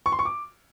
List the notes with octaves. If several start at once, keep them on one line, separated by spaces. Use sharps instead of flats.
C#6
C6
C#6
D6